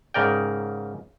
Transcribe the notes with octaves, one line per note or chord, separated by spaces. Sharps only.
G#2 C#3 A#4 D5 G5